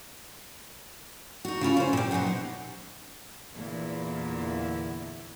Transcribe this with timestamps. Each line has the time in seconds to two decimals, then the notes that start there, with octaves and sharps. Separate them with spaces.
1.45 D#4 F#4
1.61 C#3 E4 F4 A4
1.77 C#4 C5
1.93 A#2 G4
2.11 B2 F#3 B3 C5 F#5
2.27 D#4
3.54 E2 A#2 D3 A#3 E4